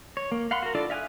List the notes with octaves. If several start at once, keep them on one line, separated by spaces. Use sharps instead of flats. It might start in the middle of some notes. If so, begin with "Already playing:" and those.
C#5
A#3
F5 F#5 B5 C6
F#4 A#4
D4 E4 F4 A4 D5
E5 F5 G#5 D#6 F#6